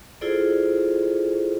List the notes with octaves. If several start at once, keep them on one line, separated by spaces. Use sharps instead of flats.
E4 F4 G#4 A4 C5 D5